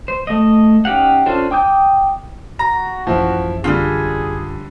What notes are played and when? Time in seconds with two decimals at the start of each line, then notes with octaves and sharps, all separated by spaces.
0.08 C5
0.27 A3 D#5
0.85 C#4 D#4 G4 F5 F#5
1.26 C#4 D4 F4 A4 C5
1.51 G5 D6 D#6 G6
2.59 F#4 A#5 A#6
3.07 A1 F#2 F3 E4
3.64 D3 G3 D4 D#4 F4 G#4